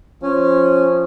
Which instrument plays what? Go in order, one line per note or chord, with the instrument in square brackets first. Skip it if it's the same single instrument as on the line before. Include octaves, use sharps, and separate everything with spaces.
[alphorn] F3 [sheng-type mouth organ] C#4